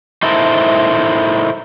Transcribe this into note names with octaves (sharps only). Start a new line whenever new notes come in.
D#4 E4 A4 A#4 C5